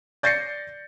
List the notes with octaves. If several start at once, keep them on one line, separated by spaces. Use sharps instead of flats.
D5 G6 A6 A#6 C7 C#7